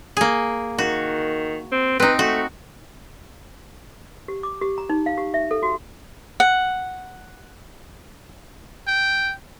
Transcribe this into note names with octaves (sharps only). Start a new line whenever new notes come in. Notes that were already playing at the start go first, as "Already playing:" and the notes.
A#3 G#4
D#3 F#4
C4
C4 D#4 B4
A3 F#4
G4
D6
G4
A#5
D#4
F5
G4
E5
A4
F#4
F#5
G5